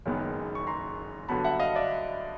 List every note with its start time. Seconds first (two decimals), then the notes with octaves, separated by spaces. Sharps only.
0.06 F#1 F#2 D#3 G#3 B3
0.55 C#6
0.67 A#5 C6
1.28 G2 D3 F#3 B3 A5 B5
1.44 E5 F#5
1.59 D#5 F5
1.76 D5 E5